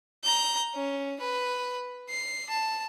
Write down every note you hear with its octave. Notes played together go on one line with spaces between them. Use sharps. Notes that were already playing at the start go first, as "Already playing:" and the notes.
A#5 G6
C#4
B4
C7
A5